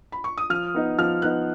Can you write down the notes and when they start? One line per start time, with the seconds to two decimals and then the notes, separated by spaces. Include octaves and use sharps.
0.12 B5
0.24 C#6
0.38 D#6
0.50 F3 F6
0.75 B3 D#4
0.98 F3 F6
1.22 B3 D#4 F#6